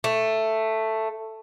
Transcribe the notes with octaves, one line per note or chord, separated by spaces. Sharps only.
A3